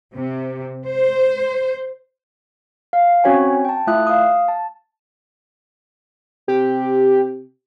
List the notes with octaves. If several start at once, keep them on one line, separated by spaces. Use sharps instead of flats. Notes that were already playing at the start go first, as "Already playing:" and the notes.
C3
C5
F5
C4 C#4 F#4 C#5 G5 G#5
G5 A5
A3 E4 F4 E5 D#6 F#6
F5 D#6
A5
C3 G4